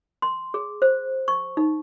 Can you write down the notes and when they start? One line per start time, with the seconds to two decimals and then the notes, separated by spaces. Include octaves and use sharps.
0.22 C6
0.54 G#4
0.82 C5
1.28 C#6
1.57 D#4